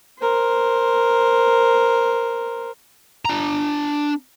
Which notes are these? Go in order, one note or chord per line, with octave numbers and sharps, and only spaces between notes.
A#4 C5
D4 A#5